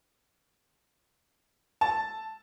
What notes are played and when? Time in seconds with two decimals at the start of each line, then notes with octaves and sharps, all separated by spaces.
1.81 A5